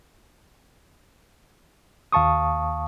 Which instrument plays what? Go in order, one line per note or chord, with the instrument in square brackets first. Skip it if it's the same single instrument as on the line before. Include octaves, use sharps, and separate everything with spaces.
[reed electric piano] D#2 F5 A5 C#6 D#6